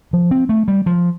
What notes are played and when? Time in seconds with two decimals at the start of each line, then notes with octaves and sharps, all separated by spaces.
0.13 F3
0.31 C4
0.49 A3
0.68 G3
0.86 F3